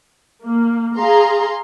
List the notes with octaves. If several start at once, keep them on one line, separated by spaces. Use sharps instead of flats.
A#3
G#4 F5 A#5 C6